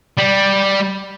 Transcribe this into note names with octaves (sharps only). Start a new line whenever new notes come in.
G3